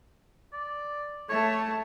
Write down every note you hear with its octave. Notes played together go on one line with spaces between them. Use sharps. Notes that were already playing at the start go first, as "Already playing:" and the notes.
D5
A3 C#5 A5